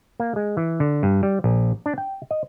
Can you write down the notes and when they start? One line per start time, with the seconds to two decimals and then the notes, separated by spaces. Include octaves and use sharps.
0.20 A#3
0.36 G#3
0.57 E3
0.80 D3
1.03 G2
1.23 G3
1.44 A#1
1.86 D4
1.98 G5
2.31 D#5